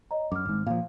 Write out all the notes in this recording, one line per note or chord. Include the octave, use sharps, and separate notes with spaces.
C#5 D#5 A#5
F#2 D6 F6
G#1 G#2
A#2 F3 F5